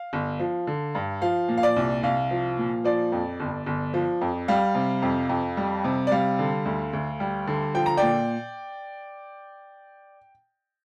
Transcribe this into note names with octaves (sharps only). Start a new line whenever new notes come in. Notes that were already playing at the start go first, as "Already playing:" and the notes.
Already playing: F5
G1
F3
D3
G2
F3 F5
A#2
F5
D5
C2
C2 F5
F3
A#2
F3 D5
F2
G1
G1
F3
F2
G3 F5
C3
F2
F2
G3
C3
D5
G3 F5
D3
D2
D2
G3
D3
F3 G5
A#5
A#2 D5 G5